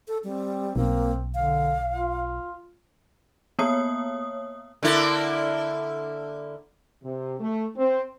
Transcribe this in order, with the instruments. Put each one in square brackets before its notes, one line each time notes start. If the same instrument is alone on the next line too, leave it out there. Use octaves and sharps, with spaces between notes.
[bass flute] A4
[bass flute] G3 [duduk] C4
[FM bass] B1 [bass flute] A#3 [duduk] C4
[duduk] D3 [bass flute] F5
[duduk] F4
[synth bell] A#3 B3 C#5 D#6
[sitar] D3 A#3 E4
[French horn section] C3
A3
C4